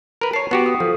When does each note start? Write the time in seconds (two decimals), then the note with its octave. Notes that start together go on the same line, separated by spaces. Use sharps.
0.21 A#4 B4
0.33 C#5 A5 C7
0.51 B3 F#4 G4
0.66 D#6
0.80 F3 A4